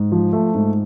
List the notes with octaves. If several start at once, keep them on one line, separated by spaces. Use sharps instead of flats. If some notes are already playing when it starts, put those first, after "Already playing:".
Already playing: G#2
F3
A3
G#2